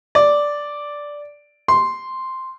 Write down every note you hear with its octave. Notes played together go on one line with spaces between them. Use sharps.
D5
C6